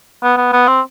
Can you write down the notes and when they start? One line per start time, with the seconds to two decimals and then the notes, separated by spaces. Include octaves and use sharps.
0.23 B3
0.37 B3
0.53 B3
0.67 C4